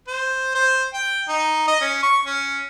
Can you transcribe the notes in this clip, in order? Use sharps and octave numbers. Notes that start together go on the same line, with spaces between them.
C5
C5
G5
D#4
D#5
C#4
C#6
C#4